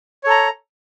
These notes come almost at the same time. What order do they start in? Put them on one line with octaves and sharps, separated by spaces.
C#5 A4 A#5